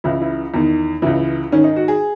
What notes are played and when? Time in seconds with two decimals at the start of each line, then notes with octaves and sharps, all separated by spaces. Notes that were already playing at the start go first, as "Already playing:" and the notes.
0.04 C#2 C#3 E3 E4
0.21 E4
0.54 E2 D#3
1.02 C#2 C#3 E3 E4
1.51 G#2 D#3 C#4
1.64 D#4
1.76 F#4
1.88 G#4